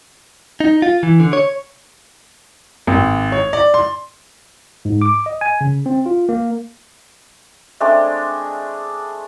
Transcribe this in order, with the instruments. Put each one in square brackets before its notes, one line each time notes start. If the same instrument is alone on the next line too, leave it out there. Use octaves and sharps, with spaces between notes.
[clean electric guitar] D#4
F4
E3
D3
C#5
[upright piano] G#1
C#5
D5
C6
[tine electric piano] G#2
D6
D#5
G#5
C#3
C4
F4
A#3
[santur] G#3 A3 C4 D4